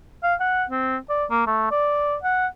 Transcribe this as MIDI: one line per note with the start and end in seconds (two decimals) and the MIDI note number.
0.23 0.35 77
0.40 0.64 78
0.70 0.97 60
1.10 1.25 74
1.30 1.43 58
1.47 1.68 57
1.71 2.16 74
2.23 2.47 78